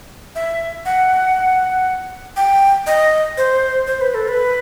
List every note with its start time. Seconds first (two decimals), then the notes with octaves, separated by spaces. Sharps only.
0.35 E5
0.85 F#5
2.37 G5
2.87 D#5
3.37 C5
3.87 C5
4.01 B4
4.15 A4
4.28 B4